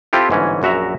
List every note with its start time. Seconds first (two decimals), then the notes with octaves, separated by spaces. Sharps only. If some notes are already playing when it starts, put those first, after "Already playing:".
0.13 C4 E4 F4 G4 A4
0.29 G1 G#2 E3 C#4
0.62 A#1 F#2 F#4 E5 A#5